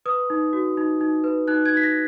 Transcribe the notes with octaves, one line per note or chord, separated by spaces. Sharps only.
B4 D#6
D#4
F#4
D#4
D#4
B4
D#4 F#6
G#6
D#4 B6
A#6